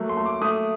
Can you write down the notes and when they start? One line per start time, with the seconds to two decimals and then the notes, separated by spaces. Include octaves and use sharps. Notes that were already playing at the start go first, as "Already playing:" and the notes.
Already playing: F#3 A3 A#3
0.09 C6
0.17 A3
0.26 D6
0.42 A3 D#6